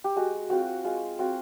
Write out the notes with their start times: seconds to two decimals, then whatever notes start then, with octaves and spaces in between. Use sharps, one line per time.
0.04 G4
0.16 G#3 F#4
0.50 C4 F4 F#4
0.84 G#3 F4
1.19 C4 F4 F#4